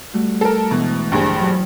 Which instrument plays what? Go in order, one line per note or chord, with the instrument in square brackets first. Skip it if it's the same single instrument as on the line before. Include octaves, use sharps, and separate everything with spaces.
[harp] G3 A3 F#4
[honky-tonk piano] A4 A#4
[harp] D2 G#2 E3 [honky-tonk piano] B2
[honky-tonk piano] A#1 G2 G#4
[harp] E2 F#3